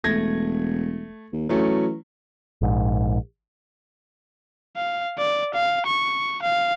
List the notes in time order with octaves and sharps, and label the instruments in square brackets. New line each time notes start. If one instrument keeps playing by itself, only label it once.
[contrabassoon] E1 [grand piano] A3 G#6 A#6
[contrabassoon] D#2
[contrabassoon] E3 [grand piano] F#3 A3 C#4
[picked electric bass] A#1 G#2
[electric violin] F5
D5
F5
C#6
F5